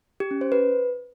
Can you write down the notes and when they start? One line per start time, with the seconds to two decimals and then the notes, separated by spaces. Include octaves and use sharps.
0.20 G4
0.31 C#4
0.41 C5
0.52 B4